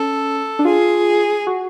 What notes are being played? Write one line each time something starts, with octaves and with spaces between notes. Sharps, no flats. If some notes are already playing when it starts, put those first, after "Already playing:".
Already playing: C#4 A4
D4
F4 G#4
F#4